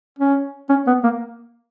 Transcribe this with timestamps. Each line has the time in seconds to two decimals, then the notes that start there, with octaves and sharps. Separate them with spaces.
0.19 C#4
0.69 C#4
0.87 B3
1.04 A#3